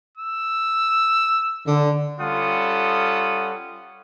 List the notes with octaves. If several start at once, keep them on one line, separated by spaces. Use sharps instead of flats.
E6
D3
G3 C#4 F4 A4 F#5 D#6